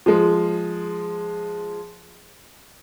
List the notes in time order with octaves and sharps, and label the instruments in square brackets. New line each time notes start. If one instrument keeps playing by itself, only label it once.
[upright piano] F3 G#3